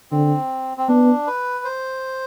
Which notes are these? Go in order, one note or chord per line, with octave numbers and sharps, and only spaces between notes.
D3 C4
C4
B3 D4
B4
C5